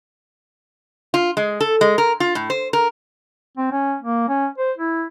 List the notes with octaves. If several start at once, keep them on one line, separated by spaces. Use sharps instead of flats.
F4
G#3
A4
G#3
A#4
F4
A2
C5
A#4
C4
C#4
A#3
C#4
C5
E4